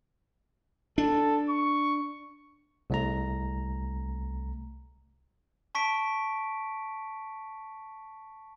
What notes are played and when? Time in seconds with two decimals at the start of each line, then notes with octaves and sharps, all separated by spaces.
0.98 D4 A4
1.50 C#6
2.90 C2 A3 A#5
5.75 A5 C#6 B6 D7